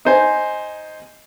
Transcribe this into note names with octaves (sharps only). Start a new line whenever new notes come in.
D#4 C5 G#5